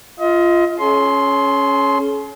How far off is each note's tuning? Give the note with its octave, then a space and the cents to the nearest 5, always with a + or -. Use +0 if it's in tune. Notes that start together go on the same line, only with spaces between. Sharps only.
F4 -10 D#5 +30
C#4 +0 G#4 +45 C6 +0